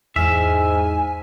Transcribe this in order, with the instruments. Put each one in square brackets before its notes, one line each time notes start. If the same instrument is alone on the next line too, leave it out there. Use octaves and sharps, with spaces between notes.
[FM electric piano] E2 F6 [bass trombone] G#2 [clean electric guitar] E5 [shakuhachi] G#5